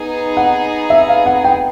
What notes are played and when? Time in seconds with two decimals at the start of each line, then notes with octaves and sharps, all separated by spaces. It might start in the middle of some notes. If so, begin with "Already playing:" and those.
Already playing: B3 D#4 G#4
0.37 F#5
0.90 E5
1.09 F5
1.26 F#5
1.44 G5